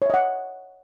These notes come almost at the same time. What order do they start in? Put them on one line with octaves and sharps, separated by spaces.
C#5 E5 D#5 F#5